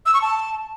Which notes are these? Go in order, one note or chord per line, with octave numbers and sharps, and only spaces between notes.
E6
C#6
A5